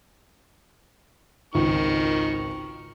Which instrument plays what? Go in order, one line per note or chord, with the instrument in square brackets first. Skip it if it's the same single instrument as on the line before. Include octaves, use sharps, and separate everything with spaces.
[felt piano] G#1 C#2 D#4 [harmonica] D#3 C#6